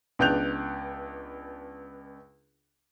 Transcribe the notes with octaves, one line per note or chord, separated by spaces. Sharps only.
C#2 B3 D4 F#6 G6 F7